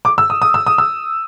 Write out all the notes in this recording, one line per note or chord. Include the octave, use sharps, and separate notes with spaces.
D6
E6
D#6
D#6
E6
D#6
E6